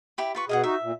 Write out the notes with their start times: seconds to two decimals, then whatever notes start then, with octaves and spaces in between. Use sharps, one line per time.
0.18 E4 G4 B5
0.35 F4 B4 C#6
0.49 B2 G#4 D#5 F5 F#5
0.64 D#4 F#4 E5
0.83 A#2